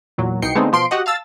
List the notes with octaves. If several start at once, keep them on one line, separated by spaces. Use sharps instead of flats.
E2 A#2 F#3
C2 B2 D#4 G5 C7 C#7
D3 G#3 A3 B3 C4 D#4
B2 F3 C6 D7
F#4 G4 D#5 F#5
F5 A5 E6 A6